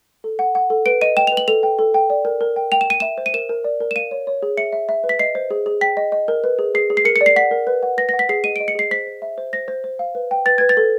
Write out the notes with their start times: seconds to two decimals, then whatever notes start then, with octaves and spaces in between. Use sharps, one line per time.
0.24 A4
0.39 F#5
0.55 F#5
0.70 A4
0.86 B4 D7
1.01 D#5 D#7
1.17 G5 E7
1.27 F7
1.32 B4
1.37 F#7
1.48 A4 F7
1.63 G5
1.79 A4
1.94 G5
2.10 D5
2.25 A#4
2.41 A#4
2.56 G5
2.72 G5 F7
2.81 E7
2.88 G5 D#7
3.00 E5 E7
3.18 C5
3.26 D#7
3.34 A#4 E7
3.49 A#4
3.64 D5
3.80 A#4
3.91 E7
3.96 F5 D#7
4.11 C#5
4.27 C#5
4.43 G#4
4.57 E5 C#7
4.73 E5
4.89 E5
5.04 B4
5.09 B6
5.19 D#5 C7
5.35 C5
5.51 G#4
5.66 G#4
5.81 G5 B6
5.97 D#5
6.12 D#5
6.28 A#4
6.44 B4
6.59 G#4
6.75 G#4 C7
6.90 G#4
6.97 C7
7.05 A#4 C#7
7.16 C#7
7.21 D5
7.26 C7
7.36 F#5 B6
7.51 A#4
7.67 B4
7.83 F#5
7.98 B4 A#6
8.09 A#6
8.13 F#5
8.19 B6
8.29 G#4 C7
8.44 D#5 D#7
8.56 D#5 D7
8.68 C#7
8.75 G#4 C7
8.91 C5 B6
9.07 C5
9.22 E5
9.38 C5
9.53 C5 A#6
9.68 C5
9.84 C5
9.99 F5
10.15 B4
10.31 G5
10.46 B4 A6
10.58 B4 G#6
10.69 A6
10.77 A4